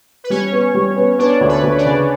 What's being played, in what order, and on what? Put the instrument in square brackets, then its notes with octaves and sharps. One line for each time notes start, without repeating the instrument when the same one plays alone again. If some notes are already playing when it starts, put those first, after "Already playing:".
[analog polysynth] B4
[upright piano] G3 [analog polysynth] C#4 C#5
[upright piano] B3
G3
B3
[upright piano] B3 [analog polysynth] D4 D5
[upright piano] D2
[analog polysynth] B4
[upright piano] D2
[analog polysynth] D4 D5
[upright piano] C#3